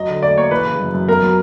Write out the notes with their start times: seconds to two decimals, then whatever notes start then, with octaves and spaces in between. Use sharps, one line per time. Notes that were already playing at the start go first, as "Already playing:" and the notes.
Already playing: F#3 D#5
0.09 D3
0.23 D2 D5
0.37 A#3 C#5
0.51 E3 B4
0.66 C#3
0.80 F#2
0.94 F#2
1.08 B3 A#4
1.23 F#3